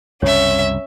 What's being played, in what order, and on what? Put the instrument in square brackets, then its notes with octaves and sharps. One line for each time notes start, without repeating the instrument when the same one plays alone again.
[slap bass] C2 F#2 C#3 [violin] C#4 E5 [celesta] C#5